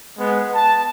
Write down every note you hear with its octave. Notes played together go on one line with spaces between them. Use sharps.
G#3 B3
A5